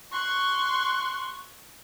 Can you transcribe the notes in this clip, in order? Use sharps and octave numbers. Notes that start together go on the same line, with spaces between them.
C6 C#6 F#6